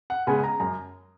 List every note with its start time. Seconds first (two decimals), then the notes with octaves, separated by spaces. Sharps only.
0.10 F#5
0.27 C#3 G#3 B3 G#5
0.44 A#5
0.60 F#2 A#5